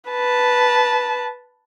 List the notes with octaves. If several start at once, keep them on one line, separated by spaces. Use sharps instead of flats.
B4 A5